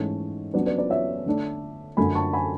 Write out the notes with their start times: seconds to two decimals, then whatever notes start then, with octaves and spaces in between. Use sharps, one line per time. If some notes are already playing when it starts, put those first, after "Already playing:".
Already playing: G#2 E3 A3 C#4 C#5
0.54 C#3 F#3 B3 D4 B4 D5
0.66 B4 D5
0.78 B4 D5
0.90 C#5 E5
1.26 D3 A3 D4
1.97 F#2 D3 A3 G#5 B5
2.15 A5 C#6
2.33 G#5 B5